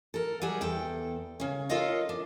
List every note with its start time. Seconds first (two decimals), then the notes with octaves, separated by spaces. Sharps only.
0.14 A4 A#4
0.42 F#3 G3 G#4
0.61 E2 A4 G5
1.40 C#3 C#4
1.69 F4 A4 A#4 C#5 D#5 F5
2.09 D4